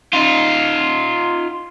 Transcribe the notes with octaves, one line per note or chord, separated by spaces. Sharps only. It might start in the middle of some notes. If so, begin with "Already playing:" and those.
D#4 F4